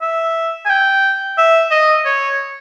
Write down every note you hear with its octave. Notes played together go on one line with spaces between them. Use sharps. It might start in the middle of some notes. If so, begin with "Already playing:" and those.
E5
G#5
G5
E5
D#5
C#5